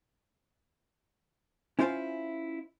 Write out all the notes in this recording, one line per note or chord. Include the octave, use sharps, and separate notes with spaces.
C#4 E4 F4 C5 F5 G#5